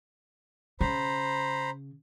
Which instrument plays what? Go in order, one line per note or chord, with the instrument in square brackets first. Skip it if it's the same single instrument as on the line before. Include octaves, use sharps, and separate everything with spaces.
[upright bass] C#3 [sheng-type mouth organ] C5 A#5 B5